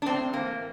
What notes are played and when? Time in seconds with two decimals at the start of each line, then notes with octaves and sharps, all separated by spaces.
0.02 D4
0.06 A2 C4
0.33 E3 A#3